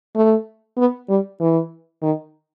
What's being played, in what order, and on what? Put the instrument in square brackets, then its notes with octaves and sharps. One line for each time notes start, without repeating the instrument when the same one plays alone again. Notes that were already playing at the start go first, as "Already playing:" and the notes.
[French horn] A3
B3
G3
E3
D#3